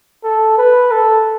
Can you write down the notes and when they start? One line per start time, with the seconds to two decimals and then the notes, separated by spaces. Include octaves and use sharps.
0.24 A4
0.58 B4
0.91 A4